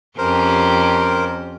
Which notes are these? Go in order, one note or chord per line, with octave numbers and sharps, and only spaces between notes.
F2 C#4 G4 A#4 C5